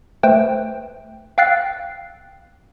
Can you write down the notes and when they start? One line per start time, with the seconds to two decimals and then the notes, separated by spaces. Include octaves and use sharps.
0.23 A3 B4 C5 G5
1.38 F5 G5 E6 F#6 A6 C7